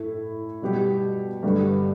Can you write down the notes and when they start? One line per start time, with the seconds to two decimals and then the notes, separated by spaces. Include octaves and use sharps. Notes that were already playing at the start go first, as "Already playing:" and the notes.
Already playing: A2 A3 E4
0.62 B2 G3 B3 G4
1.43 G2 D3 A3 G4 B4